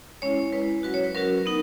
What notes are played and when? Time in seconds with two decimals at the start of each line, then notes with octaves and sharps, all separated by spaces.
0.22 G#3 C#4 E4 C#5
0.52 G#3 C#4 E4 B4
0.83 F#3 C#4 F#4 B4
0.94 C#5
1.04 B4
1.14 F#3 C#4 F#4 A#4
1.46 B3 D#4